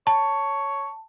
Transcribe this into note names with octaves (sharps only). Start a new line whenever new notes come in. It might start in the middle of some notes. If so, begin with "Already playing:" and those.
C#5 A5